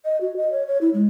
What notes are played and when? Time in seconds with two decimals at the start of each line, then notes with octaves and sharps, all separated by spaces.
0.05 D#5
0.21 F#4
0.37 D#5
0.52 C#5
0.67 C#5
0.81 E4
0.94 G#3